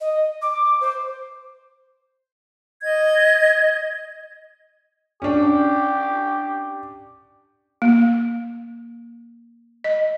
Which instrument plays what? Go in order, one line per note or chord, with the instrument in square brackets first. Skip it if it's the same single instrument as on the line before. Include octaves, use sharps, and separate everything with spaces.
[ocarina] D#5
D6
C5
[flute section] D#5 G#6
[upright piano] C#4 D4 [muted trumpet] G4
[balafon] A#3
D#5